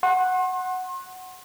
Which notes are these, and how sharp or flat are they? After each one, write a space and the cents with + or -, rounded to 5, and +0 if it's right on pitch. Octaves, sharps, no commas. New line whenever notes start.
F#5 +0 C6 +40